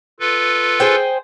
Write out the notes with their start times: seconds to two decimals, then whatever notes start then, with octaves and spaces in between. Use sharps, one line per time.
0.20 F4 A4 B4
0.80 G#4 C5 G5